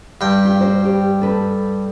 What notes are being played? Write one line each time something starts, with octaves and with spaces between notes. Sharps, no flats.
G2 G5
F4 G4
F#4 C5
G4
A4 B4